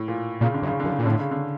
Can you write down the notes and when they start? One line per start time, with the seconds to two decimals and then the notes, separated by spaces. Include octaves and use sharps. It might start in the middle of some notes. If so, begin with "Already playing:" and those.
Already playing: A2
0.08 A#2
0.41 A#2 C#3
0.54 D3
0.62 F#2
0.67 C#3
0.80 F#2 D3
0.92 C#3
0.99 A#2
1.06 A2 D3
1.19 C#3
1.31 D3